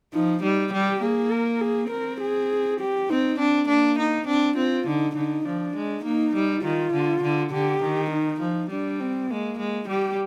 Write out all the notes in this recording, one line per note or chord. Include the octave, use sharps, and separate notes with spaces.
F3 D#4
G3 D#4
G3 G4
A#3 G#4
A#4
G#4
C4 A#4
G#4
G4
C4 D#4
C4 D4
A#3 D4
D#4
C4 D4
C4 F4
D3 D#4
D3 D#4
F3 D4
G#3
A#3 D#4
G3
D#3 F4
D3
D3
D3 G4
D#3
D#4
F3
G3 D4
C4
G#3 A#3
G#3
G3 G4